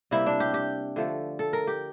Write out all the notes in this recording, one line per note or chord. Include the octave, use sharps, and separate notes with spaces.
C3 G3 A#3 E4
D4
G4
G4
D3 F3 A3
A4
A#4
G4